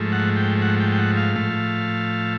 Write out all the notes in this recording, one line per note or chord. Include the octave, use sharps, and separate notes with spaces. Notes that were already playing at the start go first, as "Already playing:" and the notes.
Already playing: G#2 F3 A3
F#5
G5
F#5
G5
G5
F#5
F5
A2 F3 A3